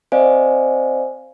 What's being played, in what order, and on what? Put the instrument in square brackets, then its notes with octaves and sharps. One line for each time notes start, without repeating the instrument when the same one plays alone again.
[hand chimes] C4 C5 D5 D#5 F5 G#5